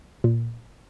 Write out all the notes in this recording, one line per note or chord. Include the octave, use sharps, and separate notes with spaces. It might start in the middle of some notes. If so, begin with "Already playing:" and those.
A#2